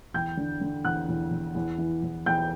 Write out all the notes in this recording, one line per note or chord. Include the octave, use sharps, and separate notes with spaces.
E2 G5 G6
D3
D3
E2 F#5 F#6
E2
E2
E2
E3
E2
E2 G5 G6